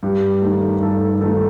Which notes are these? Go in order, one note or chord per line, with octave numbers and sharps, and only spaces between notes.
G2 G4
D#3 A3
G2 A4
D#3 A3 A4